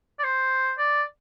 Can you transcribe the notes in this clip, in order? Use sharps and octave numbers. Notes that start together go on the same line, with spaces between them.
D5
C5
D5